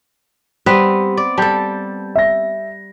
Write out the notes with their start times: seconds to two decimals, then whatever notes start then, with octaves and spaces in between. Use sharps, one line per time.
0.66 G3 B3 C4 B4
1.17 D5
1.38 G3 A4 A5 G6
2.15 E5 A#6